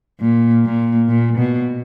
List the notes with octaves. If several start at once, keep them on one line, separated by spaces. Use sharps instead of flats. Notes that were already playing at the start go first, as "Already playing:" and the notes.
A#2
A#2
A#2
B2